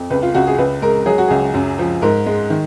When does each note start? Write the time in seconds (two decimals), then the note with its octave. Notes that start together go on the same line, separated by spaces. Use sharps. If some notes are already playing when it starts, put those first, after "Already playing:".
Already playing: F2
0.10 C#2 B4
0.23 F4
0.34 C#2 F#4
0.47 G#4
0.58 C#2 B4
0.82 G#3 A#4
1.06 F#3 G#4
1.18 F#4
1.28 C#2 G#4
1.54 F#2
1.79 F3
2.02 G#2 A#4
2.26 G#3
2.50 D#3